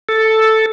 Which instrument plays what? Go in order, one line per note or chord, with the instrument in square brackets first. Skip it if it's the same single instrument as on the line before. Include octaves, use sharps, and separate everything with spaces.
[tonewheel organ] A4